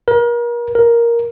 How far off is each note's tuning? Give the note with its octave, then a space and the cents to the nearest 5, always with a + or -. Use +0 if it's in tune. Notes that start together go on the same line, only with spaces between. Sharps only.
A#4 +35
A#4 +5